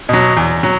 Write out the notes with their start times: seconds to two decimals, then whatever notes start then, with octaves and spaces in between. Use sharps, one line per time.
0.09 B2 F#3
0.37 E2
0.63 F#3